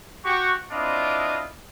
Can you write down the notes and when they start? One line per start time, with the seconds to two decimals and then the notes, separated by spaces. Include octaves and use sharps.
0.25 F#4 G4 C#6
0.71 C4 D4 E4 F4 D5 D#5